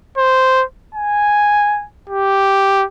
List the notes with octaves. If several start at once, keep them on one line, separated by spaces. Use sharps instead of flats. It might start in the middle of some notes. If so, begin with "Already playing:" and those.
C5
G#5
G4